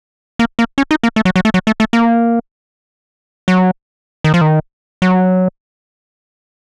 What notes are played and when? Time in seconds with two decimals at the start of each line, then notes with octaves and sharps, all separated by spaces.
0.39 A#3
0.59 A#3
0.78 C#4
0.91 D#4
1.03 A#3
1.16 A3
1.25 F#3
1.36 F#3
1.45 A3
1.54 F#3
1.67 A3
1.80 A3
1.93 A#3
3.48 F#3
4.24 D#3
4.34 F3
4.41 D#3
5.02 F#3